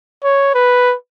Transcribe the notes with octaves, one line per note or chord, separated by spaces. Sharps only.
C#5
B4